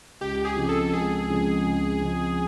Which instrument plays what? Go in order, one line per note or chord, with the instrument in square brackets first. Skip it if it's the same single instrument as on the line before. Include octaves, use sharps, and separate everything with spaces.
[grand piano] C#2 [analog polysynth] G4
[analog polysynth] G#4
[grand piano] C#3 F3 G#3 C4
[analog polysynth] A4
[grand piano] C#2 [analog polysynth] G#4
[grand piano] C#3 F3 G#3 C4
C#2
C#3 F3 G#3 C4